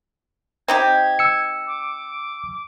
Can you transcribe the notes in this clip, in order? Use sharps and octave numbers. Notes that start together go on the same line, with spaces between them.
C4 D#4 G4 G#6
E6 C#7
D6